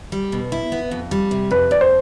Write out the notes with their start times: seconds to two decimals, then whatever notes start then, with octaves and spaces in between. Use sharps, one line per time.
0.12 G3
0.32 B2
0.52 E4
0.72 B3
0.91 F2
1.11 G3
1.31 C3
1.51 F2 B4
1.71 F2 D5
1.81 C5